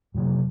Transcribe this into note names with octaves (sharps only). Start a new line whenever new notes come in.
F2 C3 F#3